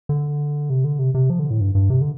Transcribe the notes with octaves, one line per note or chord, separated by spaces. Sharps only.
D3
C3
D3
C3
C3
F3
D3
A2
G2
G2
C3
D3